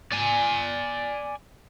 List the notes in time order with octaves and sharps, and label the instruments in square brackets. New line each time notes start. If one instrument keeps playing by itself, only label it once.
[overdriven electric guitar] D5 G#5